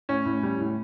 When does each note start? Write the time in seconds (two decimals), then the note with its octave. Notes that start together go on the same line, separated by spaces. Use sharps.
0.09 A2 C#4
0.26 A2
0.43 G3
0.60 A2